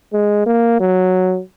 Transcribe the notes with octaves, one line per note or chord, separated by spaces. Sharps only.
G#3
A#3
F#3